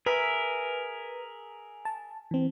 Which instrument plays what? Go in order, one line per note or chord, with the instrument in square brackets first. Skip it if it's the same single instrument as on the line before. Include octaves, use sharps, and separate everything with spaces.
[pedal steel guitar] G#4 A#4 E5 [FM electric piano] B4
[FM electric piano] A5
E3 C4